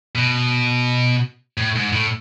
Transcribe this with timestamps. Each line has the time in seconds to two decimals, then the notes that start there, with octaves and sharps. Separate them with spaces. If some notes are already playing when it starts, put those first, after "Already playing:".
0.15 B2
1.57 A2
1.76 G#2
1.93 A2